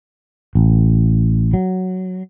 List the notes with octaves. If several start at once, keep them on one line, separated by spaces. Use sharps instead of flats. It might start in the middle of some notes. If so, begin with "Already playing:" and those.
A1
F#3